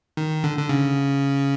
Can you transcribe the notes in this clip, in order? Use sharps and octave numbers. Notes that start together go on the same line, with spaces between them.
D#3
D3
D3
C#3